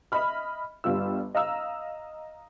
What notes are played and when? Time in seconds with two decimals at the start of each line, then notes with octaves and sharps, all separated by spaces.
0.12 D#5 E5 B5 F6
0.84 G1 G3 F4 E6
1.35 D#5 F5 A#5 E6